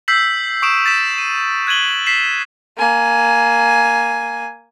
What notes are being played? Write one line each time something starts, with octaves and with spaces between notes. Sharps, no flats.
E6 G6 B6 C7 F#7
C#6 D#6 D7 E7
A6 B6 E7
D#7
F#6 G#6 D#7 F#7 G7
B6 C7 E7
A#3 G#5